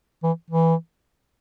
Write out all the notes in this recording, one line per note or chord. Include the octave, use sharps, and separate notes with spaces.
E3
E3